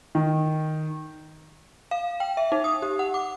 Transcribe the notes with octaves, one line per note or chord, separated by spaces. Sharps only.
D#3
F5
G5
E5
D#4
D#6
G4
F#5
D6